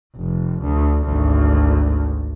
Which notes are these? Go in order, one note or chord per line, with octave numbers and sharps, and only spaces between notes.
F1
D2
G#1 D2